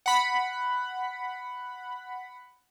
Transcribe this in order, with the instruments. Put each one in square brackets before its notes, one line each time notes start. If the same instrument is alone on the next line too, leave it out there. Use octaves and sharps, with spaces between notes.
[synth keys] F#5 B5